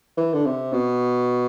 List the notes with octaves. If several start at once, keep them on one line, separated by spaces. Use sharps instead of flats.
E3
D3
C3
B2